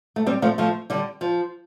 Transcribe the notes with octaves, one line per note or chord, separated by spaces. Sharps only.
A3
G3 C4
F3 A3
F3 A3
D3 G3
F3